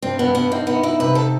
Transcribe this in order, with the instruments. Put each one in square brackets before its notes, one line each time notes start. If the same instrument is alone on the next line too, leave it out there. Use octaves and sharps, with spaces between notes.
[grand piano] G2 [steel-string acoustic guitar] C4
[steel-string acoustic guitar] B3
[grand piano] G2
[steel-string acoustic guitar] B3
[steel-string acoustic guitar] C4 [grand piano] D#4
[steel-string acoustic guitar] B3
[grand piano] D#4
[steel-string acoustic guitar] E4
[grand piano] C3 [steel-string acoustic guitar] B4
[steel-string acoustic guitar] A4